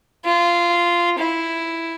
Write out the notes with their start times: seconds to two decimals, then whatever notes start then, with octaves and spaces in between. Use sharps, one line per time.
0.25 F4
1.19 E4